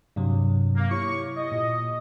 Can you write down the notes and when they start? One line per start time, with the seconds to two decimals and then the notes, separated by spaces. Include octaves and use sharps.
0.16 G2 C3 F#3
0.77 A#3
0.91 E4 G4 C#5 C#6
1.37 D#5
1.52 A#2